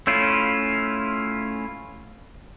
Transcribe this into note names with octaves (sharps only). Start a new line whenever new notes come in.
A3 C#4 E4 F4